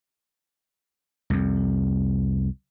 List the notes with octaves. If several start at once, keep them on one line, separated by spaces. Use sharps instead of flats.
C2 F2